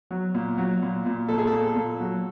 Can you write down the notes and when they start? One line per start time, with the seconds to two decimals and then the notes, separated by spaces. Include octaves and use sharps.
0.11 F#3
0.34 A#2
0.58 F#3
0.82 A#2
1.06 A#2
1.28 A#2 A4
1.38 G#4
1.47 A4
1.52 A#2
1.76 A#2
2.00 F#3